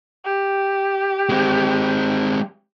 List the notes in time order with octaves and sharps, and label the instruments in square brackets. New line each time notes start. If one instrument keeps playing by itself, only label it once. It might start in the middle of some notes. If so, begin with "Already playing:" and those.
[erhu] G4
[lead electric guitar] G#3 C4